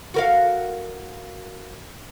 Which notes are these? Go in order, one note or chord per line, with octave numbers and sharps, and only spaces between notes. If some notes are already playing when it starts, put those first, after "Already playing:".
F#4 A#4 F5